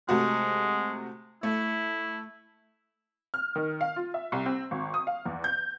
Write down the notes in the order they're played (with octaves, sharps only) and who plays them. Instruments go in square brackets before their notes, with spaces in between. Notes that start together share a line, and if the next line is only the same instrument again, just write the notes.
[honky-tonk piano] C3 A3 F#4 [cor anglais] G#3
[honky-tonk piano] A3 [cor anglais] E4
[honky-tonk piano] F6
D#3
F5
F4
E5
C2
C4
G#1
D#6
F5
E2
G6